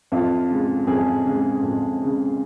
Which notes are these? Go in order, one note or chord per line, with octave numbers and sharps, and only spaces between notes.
F2 F4
C#3 G#3
F2 G#4
C#3 G#3
F2
C#3 G#3